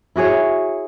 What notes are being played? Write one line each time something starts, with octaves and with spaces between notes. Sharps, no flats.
E4 F#4 G#4 C#5